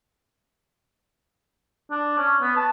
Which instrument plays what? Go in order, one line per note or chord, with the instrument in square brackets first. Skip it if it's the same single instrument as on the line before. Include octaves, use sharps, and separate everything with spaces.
[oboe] D4
C#4
B3
A5